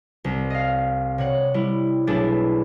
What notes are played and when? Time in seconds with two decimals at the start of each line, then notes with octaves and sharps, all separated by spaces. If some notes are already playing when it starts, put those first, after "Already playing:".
0.24 C2
0.50 D#5 F5
1.18 C3 C#5 F#5
1.54 G3 E4
2.07 B1 A3 D4 E4 G#4 A6